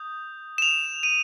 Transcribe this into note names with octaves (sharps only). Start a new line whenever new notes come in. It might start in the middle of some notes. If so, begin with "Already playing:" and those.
Already playing: D#6 G6
E7
F7
D#7